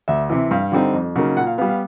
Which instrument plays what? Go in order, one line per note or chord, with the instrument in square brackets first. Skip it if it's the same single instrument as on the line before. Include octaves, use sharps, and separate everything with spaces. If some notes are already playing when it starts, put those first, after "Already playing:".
[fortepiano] D2 E5
C3 E3
G2 F5
D3 G3 C4 D#4
F2
C#3 F#3 A#3 D#4
A#2 F#5
F5
B3 F5
G3
F5